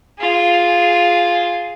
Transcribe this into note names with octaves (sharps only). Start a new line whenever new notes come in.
F4 G#4